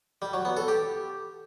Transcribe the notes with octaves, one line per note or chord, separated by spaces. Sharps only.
G3
F#3
B3
A4
G4